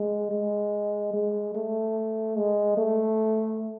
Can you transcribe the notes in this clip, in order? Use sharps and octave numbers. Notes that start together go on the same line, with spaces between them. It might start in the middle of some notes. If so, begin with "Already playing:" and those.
Already playing: G#3
G#3
G#3
A3
G#3
A3